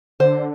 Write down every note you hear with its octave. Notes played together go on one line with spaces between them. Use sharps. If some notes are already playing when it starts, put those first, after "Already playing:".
D3 C5